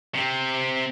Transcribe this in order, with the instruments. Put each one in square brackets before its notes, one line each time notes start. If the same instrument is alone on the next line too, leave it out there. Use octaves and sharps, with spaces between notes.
[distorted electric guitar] C3 C4